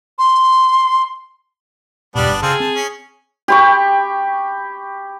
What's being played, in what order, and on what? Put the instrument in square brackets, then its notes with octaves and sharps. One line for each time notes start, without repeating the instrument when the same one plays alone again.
[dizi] C6
[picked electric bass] E2 G#2 B2 [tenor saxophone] G3 [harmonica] B3 D4
[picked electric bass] G1
[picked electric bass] C#3 [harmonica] C4 F4 A4 [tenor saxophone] G#4
[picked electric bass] C4 [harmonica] A5
[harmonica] C#4
[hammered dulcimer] G4 B5 C#6